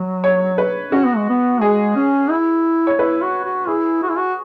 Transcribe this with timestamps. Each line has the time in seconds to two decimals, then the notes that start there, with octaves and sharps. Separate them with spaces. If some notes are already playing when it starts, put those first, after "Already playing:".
Already playing: F#3
0.24 C#5
0.58 B4
0.92 C#4 F#4
1.05 B3
1.17 G#3
1.30 B3
1.61 G#3 G#4
1.96 C#4
2.30 E4
2.87 C#5
2.99 E4 B4
3.22 F#4
3.45 F#4
3.67 E4 G#4
4.03 F#4
4.09 E4
4.17 F#4